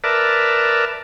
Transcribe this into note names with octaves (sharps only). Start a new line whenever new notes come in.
A#4 B4 D5 E5 A5